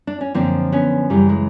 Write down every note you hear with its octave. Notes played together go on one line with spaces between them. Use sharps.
D4
C#4
F#2 D3 F3 A#3 C4
B3 C#4
F#2 C#3 E3 G3
G#3